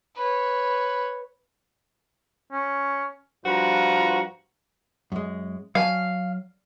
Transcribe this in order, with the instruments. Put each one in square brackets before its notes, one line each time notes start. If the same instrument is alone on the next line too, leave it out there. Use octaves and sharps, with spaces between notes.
[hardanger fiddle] B4 C#5
[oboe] C#4
[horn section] G2 F3 F4 F#4 B4 A#5
[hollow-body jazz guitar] F#2 G#3
[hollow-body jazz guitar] F#3 G#5 A5 [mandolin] F5